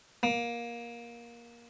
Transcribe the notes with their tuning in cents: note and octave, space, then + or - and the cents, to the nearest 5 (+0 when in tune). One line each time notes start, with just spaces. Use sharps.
A#3 +20